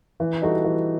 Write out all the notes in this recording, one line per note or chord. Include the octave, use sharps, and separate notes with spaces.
E3
G3 D#4 F#4 A4
E3